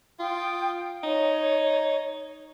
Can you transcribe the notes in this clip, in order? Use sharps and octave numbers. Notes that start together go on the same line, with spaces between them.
F4 G5 D#6
D#4 C#5